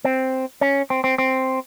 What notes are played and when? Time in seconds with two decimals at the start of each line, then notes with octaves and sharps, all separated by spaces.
0.05 C4
0.61 C#4
0.90 C4
1.04 C4
1.18 C4